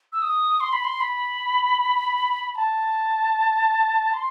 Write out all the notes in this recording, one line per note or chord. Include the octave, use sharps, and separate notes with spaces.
E6
D#6
C6
B5
C6
B5
B5
A5
C6